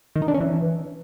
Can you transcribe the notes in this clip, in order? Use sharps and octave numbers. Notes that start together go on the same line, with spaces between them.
D#3
D#4
D4
C#4
E3